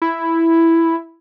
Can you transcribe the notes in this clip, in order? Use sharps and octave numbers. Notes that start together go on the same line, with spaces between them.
E4